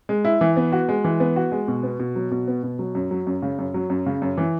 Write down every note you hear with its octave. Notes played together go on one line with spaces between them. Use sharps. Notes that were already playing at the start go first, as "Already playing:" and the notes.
G#3
E4
E3
B3
F#4
G#3
E3
B3
F#4
G#3
B2
B3
B2
F#3
B2
B3
B2
F#3
F#2
F#3
F#2
C#3
F#2
F#3
F#2
C#3
F#2
E3